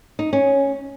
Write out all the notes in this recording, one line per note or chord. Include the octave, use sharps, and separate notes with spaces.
D#4
C#4